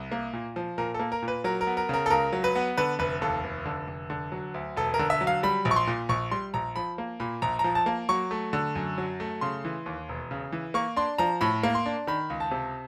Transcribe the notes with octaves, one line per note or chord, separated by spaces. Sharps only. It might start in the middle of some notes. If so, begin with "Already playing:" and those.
Already playing: C2
A#3
A#2
F3
A#2 A#4
A4
A#3
A#4
A#2
B4
F#3 A#4
A#4
B3
A#4
C#3 A#4
A4
C#2 A#4
F#3
B4
B3
D3 B4
F1 B4
D#2 A4
F1
D3
F1
D3
F#3
D2
E1 A4
A#4
D3
E5
F#3
F5
G3 B5
A#1
C#6
C6
A#2
A#1 C#6
G3 C6
A#1 A#5
F3 B5
A#3
A#2 B5
A#1 A#5
A#5
F3
A5
A#3
F#3 C#6
A3
D3
F#2
F#3
A3
C#3 C6
E3
D#2
E1
C#3
E3
A#3 C#6
D4 C6
F3 A#5
A2 B5
A#3
C6
D4
D#3 B5
C#2
A5
C3